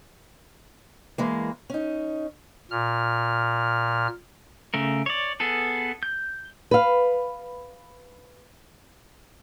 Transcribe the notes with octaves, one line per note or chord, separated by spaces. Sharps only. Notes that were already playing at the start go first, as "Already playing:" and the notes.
E3 G#3 A#3
C#4 D#4
A#2 F6
C#3 A3 A#4
C#5 D5
B3 G#4 A4 B4
G6
B4 F5